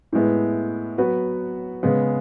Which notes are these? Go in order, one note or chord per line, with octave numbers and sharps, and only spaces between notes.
A2 G#3 B3 E4
F#3 B3 F#4 B4
C#3 G#3 B3